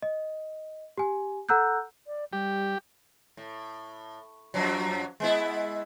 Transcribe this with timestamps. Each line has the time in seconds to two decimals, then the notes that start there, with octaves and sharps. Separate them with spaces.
0.02 D#5
0.98 G4 G#5
1.49 A4 F#5 A#5 E6 F#6 G6
2.07 D5
2.33 G3 G4
3.37 A2
4.54 F#2 F3 F#3
5.20 G#3 B3 E4